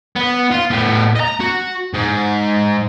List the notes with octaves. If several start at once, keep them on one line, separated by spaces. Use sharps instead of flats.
B3
F4
A2 B3
D#5 A#5
F#4
G#2